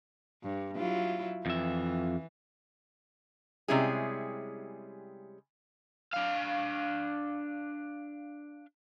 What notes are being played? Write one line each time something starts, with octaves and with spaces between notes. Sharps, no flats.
G2
F#3 E4 F4
F2 E3 E5
C3 G3 G#3 C#4 E4 G#4
D4 F5